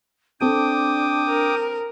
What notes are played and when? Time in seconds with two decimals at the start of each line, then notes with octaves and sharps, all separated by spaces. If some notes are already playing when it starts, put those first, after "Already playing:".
0.41 C4 D4 A4 G5 A5 D6 D#6
1.29 A#4